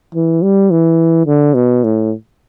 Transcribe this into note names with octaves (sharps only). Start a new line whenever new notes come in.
E3
G3
E3
D3
B2
A2